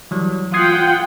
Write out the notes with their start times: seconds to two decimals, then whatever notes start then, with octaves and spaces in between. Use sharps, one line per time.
0.11 E3 F#3 G3
0.54 F4 F#5 G5 D#6 G#6 C7